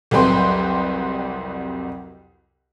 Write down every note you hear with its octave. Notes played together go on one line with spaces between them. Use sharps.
C2 F2 F#3 B4 G5 C6